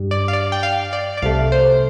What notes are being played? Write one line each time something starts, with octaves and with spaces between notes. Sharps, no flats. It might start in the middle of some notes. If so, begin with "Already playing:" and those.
Already playing: G2 G3
D5
F5
D5
G5
F5
D5
D5
C2 C3 A3 F5
C5